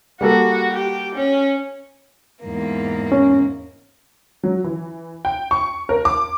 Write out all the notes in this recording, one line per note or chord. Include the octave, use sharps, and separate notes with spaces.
G3 A#3 F#4 A4
G4
C#4
E2 G#2 A#3
C#4
F#3
E3
G5
C#6
A#4
D6